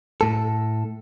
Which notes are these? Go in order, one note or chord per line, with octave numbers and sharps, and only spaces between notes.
A2 A4